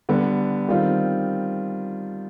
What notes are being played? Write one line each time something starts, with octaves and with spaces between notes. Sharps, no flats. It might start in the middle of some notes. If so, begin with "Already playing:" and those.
D3 G3 B3
D#3 G3 C4 F4